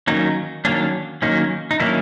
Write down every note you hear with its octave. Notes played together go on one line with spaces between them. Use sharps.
D#3 F#3 A#3 C#4 D#4
D#3 F#3 A#3 C#4 D4
D#3 F#3 A#3 C#4 D#4
D#4
D#3 F#3 A#3 C#4 D4 E4